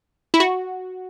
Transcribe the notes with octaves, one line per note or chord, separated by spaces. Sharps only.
E4
F#4